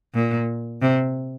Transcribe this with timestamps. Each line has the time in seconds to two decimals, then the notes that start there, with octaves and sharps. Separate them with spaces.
0.15 A#2
0.82 C3